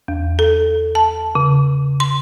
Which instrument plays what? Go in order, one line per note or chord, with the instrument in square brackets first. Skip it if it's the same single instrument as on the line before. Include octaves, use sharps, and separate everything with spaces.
[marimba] E2
A4
A5
C#3
C6